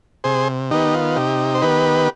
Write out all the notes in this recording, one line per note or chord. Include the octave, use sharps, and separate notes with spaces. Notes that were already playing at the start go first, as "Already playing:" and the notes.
C3 G#4 C5
D#3 B3 D#4 G4
F4
C3 D#4 G4
C5
D#3 B3 G4 B4